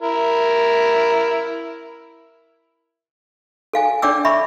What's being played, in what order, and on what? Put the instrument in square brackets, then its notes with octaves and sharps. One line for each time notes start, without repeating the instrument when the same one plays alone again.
[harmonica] E4 A#4
[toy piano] A4 F5 G#5
D4 A4 D5 G5 D6 E6
E5 B5 C#6